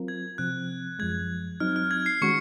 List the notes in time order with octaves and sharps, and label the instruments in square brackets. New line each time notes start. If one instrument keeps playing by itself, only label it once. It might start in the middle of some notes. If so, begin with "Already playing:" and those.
Already playing: [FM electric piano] F#3 C4 F4 A#4
[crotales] G#6
[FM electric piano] C3 F3 C4 [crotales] F#6
[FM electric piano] F#2 F3 G#3 [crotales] G#6
[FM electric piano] F#3 C4 D#4 [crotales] F6
[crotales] F6
G#6
C7
[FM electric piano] D#3 G#3 C#4 F#4 [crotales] C#6 C#7